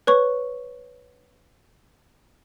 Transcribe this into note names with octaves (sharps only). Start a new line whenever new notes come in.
B4 C#5 C#6